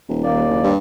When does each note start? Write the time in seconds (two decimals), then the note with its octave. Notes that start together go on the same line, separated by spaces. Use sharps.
0.09 D#1
0.24 D#2 A#3 D5
0.50 F#1
0.64 G2